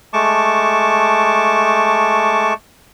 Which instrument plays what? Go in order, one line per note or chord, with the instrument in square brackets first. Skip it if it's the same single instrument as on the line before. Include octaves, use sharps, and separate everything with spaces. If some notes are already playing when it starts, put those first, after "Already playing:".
[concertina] G#3 A3 A5 C#6 D6